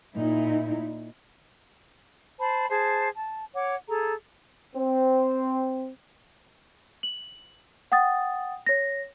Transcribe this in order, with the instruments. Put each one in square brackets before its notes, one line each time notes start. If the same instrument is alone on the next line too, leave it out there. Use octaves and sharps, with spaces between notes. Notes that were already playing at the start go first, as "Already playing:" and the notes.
[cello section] A#2 D#4 E4
[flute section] C5 A5 B5
G#4 C5 A5
A5
C#5 F#5 D6
G#4 A4 A#5
[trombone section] C4
[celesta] F#7
F#5 G5 D#6 A6
C#5 A#6